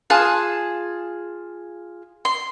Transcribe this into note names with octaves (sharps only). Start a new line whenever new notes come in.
F4 G#4 A5 F#6
C6